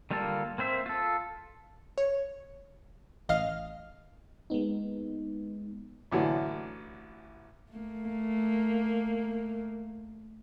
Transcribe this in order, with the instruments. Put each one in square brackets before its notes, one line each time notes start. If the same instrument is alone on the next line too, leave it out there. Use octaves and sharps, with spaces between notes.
[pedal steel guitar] D3 G3 A#3 F4 A4
A#3 C4 C5 E5
F4 A4
[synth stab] C#5
A1 D#5 F5 F6
[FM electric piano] G#3 A#3 B3 D#4
[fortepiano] A1 D3 E3 F#3
[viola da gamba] A3 A#3